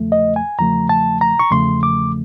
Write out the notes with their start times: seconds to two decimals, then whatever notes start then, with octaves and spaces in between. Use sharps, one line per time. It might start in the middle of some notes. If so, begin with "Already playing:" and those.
Already playing: E2 C#3 F3 A3
0.12 D#5
0.36 G#5
0.58 E2 C#3 F3 A3 A#5
0.89 A5
1.21 A#5
1.39 C#6
1.51 E2 C#3 F3 A3 C6
1.83 D6